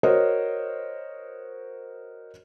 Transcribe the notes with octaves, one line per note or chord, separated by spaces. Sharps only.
F#4 A#4 C5 C#5 D#5